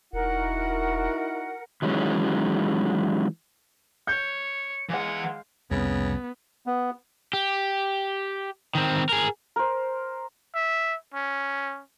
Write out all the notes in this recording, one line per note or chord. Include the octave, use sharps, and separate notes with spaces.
E1 D#4 E4 F#4 A#4 F#5
D#3 E3 F#3 G#3 C#4
C#5 G6 C#7
E3 G#3 F5 F#5
C2 F2 C#3 B3
B3
G4
D#3 C4
G#4 A#4
A#4 C5
E5
C#4